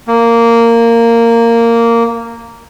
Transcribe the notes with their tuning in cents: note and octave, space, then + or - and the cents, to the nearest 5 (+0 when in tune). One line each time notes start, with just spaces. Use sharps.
A#3 -10